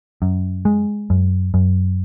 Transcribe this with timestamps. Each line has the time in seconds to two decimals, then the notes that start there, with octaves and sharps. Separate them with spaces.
0.22 F#2
0.65 G#3
1.10 F#2
1.54 F#2